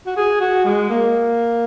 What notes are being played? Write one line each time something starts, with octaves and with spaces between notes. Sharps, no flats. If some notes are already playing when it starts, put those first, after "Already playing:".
F#4
G#4
F#4
G#3
A#3